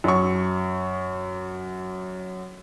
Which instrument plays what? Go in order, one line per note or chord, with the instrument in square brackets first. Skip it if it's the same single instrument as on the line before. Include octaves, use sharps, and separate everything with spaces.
[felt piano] F#2 C#6